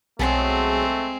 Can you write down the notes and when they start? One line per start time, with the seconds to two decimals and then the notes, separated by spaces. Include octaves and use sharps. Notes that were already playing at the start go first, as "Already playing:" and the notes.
0.19 B1 F#3 G#3 A3 C4 G#4 A4